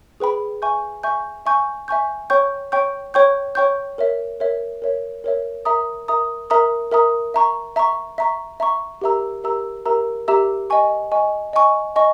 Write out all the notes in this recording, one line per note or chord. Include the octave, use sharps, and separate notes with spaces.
G#4 B4 G5 B5
E5 G#5 C#6 G6
E5 G#5 C#6 G6
E5 G#5 C#6 G6
E5 G#5 C#6 G6
C#5 G5 C#6 G6
C#5 G5 C#6 G6
C#5 G5 C#6 G6
C#5 G5 C#6 G6
A#4 C#5 E5
A#4 C#5 E5
A#4 C#5 E5
A#4 C#5 E5
A#4 E5 A#5 D#6
A#4 E5 A#5 D#6
A#4 E5 A#5 D#6
A#4 E5 A#5 D#6
E5 A#5 C#6
E5 A#5 C#6
E5 A#5 C#6
E5 A#5 C#6
G4 A#4 E5 A#5 E6
G4 A#4 E5 A#5 E6
G4 A#4 E5 A#5 E6
G4 A#4 E5 A#5 E6
D#5 G#5 C#6
D#5 G#5 C#6
D#5 G#5 C#6
D#5 G#5 C#6